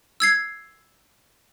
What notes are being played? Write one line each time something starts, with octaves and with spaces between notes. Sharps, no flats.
E6 G#6 C7